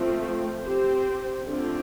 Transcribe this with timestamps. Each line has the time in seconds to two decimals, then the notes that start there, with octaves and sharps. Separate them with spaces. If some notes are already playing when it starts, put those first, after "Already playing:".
Already playing: F3 A3 C4
0.63 C4 G4 C5
1.46 D3 A3 C4 F4